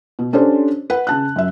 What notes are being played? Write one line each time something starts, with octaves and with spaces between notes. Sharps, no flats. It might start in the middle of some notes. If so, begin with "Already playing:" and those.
B2
C#4 D4 G4 A4 C5
B4 F#5
C#3 A5 F#6
F#2 E5